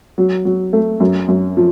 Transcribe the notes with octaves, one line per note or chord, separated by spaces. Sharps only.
F#3
F#3
A3
F#2
F#2
F3